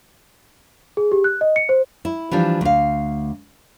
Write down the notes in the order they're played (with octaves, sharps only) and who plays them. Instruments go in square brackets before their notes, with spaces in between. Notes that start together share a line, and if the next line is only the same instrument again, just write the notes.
[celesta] G#4
G4
F#6
D#5
C#7
C5
[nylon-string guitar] E4
E3 F3 G3 D4
D2 F5